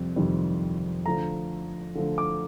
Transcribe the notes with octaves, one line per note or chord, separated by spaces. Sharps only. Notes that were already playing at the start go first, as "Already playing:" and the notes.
Already playing: F2 C3 G3
F2 C3 D#3 G3 C4
D3 F3 A3 A#5
D3 F3 A3
D6